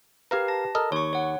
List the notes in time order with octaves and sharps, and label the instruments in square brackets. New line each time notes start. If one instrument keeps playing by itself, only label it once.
[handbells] G4 B4 [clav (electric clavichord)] A#4 F5 A#5
[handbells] A5 A#6
[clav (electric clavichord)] A4 A#4 D#5
[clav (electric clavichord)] D#2 [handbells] C#5 C#6
[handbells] C#5 F#5